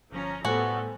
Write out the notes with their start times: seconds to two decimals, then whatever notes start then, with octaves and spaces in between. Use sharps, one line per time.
0.12 G1 F3 C#4 A#5
0.45 A2 G3 A3 B3 F#4 A4 C5 G#5